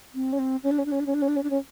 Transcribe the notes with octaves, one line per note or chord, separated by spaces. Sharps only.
C4
C#4
C4
C#4
D4
C#4
D4
C#4
D4
C#4
D4
C#4
D4
C#4
D4
C#4